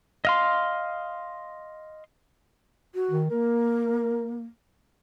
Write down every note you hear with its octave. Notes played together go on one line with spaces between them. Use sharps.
D#5 F5 C6
F#4
D#3
A#3 A#4